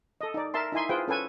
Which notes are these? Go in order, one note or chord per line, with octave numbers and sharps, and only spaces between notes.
A4 D#5
D#4 D5
A#4 E5 A5 C6
D#4 E4 G#5 C6
F4 G#4 B4 C5 G5
C#4 A4 B4 G#5